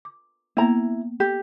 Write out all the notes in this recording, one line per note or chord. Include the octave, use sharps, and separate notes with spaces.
D6
A#3 B3 E4 A#5
G4